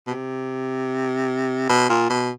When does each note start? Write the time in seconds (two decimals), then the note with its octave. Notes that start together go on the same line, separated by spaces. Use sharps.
0.07 B2
0.11 C3
1.69 B2
1.90 A#2
2.10 B2